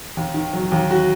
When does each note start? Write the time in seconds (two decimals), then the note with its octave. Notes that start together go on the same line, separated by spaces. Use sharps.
0.17 D#2
0.34 D#3
0.53 F#3
0.72 D#2
0.91 F#4